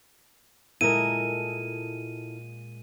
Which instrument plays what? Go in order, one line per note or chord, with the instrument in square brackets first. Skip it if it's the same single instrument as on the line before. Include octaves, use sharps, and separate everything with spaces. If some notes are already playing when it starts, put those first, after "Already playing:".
[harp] A#2 G#3 [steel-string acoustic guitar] E4 A4 A#4 [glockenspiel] D#7